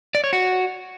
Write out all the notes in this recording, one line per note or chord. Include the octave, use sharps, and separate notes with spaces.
D5
C#5
F#4